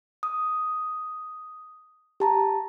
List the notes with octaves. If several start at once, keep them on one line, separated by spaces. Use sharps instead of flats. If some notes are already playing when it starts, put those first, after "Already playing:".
D#6
G4 A5 A#5